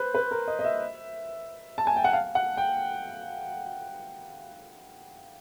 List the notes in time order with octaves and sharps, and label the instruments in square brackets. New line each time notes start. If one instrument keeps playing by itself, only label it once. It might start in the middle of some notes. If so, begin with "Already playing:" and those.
Already playing: [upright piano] B4 C5
B4
A#4
D#5
D#5
E5
A5
G#5
G5
F#5
F5
F#5
G5